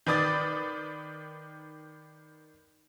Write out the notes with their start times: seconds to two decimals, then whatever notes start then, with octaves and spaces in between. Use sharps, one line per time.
0.06 D#3 B4 D5 D#6 A6